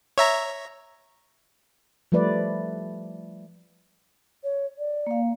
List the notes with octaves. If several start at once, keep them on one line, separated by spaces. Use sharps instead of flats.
C#5 E5 A#5
F3 G3 A3 B4 D5
C#5
D5
A#3 F5